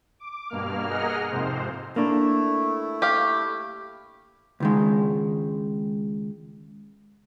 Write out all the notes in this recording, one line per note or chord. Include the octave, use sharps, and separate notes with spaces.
D6
G2 B2 A#3 F6
G#4 A#4 D#5 F#5 A#5 F6
F2 G#2 C3 C5
A3 A#3 D4 E4
G4 F5
C#2 D#3 G#3